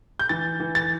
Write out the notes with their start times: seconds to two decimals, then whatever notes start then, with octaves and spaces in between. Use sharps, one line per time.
0.19 G6
0.29 E3 A6
0.60 E3
0.75 A6